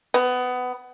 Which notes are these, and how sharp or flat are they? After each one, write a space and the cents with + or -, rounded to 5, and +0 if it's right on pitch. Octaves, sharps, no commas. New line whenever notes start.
B3 +20